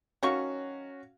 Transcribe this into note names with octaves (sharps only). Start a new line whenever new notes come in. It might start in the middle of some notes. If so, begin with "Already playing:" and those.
D#3 F#3 C#4 F#4 F5 C#6